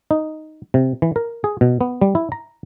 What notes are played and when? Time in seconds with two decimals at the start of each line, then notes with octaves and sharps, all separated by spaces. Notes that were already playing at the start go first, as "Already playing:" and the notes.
0.11 D#4
0.74 C3
1.02 E3
1.16 A#4
1.44 G#4
1.61 B2
1.81 B3
2.02 G3
2.15 E4
2.32 A#5